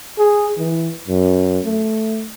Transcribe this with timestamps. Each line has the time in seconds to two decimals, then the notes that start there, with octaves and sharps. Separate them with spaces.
0.18 G#4
0.57 E3
1.08 F#2
1.65 A3